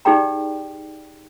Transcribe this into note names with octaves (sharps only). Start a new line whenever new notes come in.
D#4 G4 G#4 D5 G5 A#5